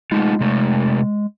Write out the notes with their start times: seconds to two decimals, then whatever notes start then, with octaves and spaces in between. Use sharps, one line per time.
0.12 G#3 A3 D#4 F4
0.41 C3 A3